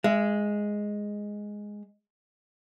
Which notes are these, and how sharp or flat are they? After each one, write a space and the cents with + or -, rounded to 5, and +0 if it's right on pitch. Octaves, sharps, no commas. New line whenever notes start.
G#3 +0 E5 +35